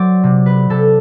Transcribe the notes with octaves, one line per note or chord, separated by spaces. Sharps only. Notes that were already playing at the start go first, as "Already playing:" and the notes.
Already playing: F#3 C5 D5
C3
B4
C3 A4